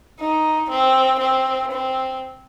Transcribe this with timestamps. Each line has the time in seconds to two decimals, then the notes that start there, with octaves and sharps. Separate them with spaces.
0.20 D#4
0.70 C4
1.20 C4
1.71 C4